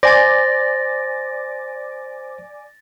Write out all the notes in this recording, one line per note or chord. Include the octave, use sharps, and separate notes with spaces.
C5 D5 G#5 D6 A6 A#6